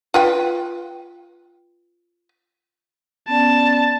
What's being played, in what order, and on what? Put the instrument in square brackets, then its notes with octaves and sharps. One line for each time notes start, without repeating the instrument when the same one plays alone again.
[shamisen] F4 B4 G5
[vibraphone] B3 C#4 D5 [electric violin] A5